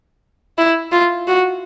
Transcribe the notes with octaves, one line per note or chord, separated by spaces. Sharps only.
E4
F4
F#4